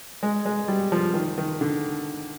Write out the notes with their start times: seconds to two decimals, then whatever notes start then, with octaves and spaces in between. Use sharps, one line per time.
0.23 G#3
0.45 G#3
0.68 G3
0.92 F3
1.14 D#3
1.38 D#3
1.61 D3